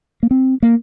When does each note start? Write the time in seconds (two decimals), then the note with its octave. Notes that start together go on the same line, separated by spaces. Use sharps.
0.23 A#3
0.31 C4
0.63 A#3